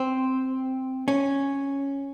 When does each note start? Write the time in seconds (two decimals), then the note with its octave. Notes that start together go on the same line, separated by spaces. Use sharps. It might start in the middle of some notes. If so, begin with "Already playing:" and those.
Already playing: C4
1.08 C#4